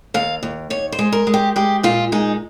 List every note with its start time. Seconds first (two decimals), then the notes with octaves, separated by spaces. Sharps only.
0.14 D#2 F5
0.43 D#2
0.70 D#2 C#5
0.92 C5
0.99 G#3
1.12 A#4
1.27 G#3
1.34 G4
1.56 G#3 G4
1.83 A#2 F4
2.12 G#3 D#4